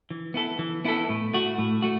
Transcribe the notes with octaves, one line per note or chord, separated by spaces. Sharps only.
E3
B3 E4 A4
E3
B3 E4 A4
A2
A3 F#4
A2
A3 F#4